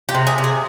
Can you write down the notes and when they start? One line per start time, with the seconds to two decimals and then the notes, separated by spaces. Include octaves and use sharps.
0.09 G4
0.15 C3
0.27 G#4
0.38 C3
0.44 G#4